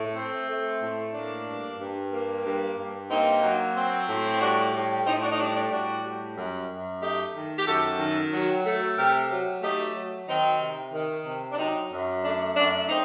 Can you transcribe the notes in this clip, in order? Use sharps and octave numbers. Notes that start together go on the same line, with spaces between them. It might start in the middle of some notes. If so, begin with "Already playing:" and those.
Already playing: A2 A3
C4
A3
A2
A#3 D4
G2
G2
A#3
G2
G2
A#3 C4 D#4
F#3
C4
A2
G3 D4 F#4
A2
A2 C4 D#4
D4 F#4
D#4
G3 D4
D4
A2 D4 F#4
G3
F#2
F#2
A3 D#4 G4
D#3
G4
F#2 F#4 A4
D#3
F#3
A3
C3 G4 A#4
F#3
A3 D#4 G4
F#3
D#3 C4 D#4
C3
D#3
C3
D4
F#3 C4 D#4
F#2
A3 D4
F#2 D4
C4 D#4